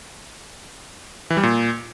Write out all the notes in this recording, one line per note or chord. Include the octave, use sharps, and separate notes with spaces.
E3
G3
A#2